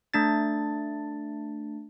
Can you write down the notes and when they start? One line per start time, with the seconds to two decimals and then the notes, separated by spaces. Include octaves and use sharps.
0.14 A3 D4 A6